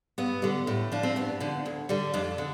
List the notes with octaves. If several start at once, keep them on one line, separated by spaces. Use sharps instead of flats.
G2 B3
D3 G3
A2
F3 D4
C4
G2 B3
D3 F3
D2
D3 G3
F2 D4
D3